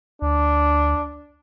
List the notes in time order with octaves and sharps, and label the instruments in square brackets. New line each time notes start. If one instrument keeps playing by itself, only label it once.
[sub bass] D2 [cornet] D4